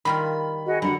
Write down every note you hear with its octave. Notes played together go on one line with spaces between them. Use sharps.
D#3 G3 F4 B5
F#4 G#4 D#5
D3 G3 D4 F#4 F#5 A#5 B5